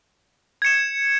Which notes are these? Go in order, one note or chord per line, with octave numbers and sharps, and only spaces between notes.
G#6 C#7 E7